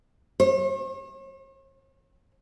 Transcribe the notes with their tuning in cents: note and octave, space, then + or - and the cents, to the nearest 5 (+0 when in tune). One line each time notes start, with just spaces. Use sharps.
C#5 -45